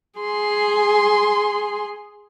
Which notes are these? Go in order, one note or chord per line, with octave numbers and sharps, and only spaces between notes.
G#4 C6